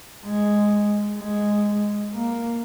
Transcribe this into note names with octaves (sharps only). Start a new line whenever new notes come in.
G#3
G#3
A#3